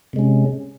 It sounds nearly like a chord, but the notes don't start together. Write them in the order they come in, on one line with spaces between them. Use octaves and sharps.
C3 G#3 C#4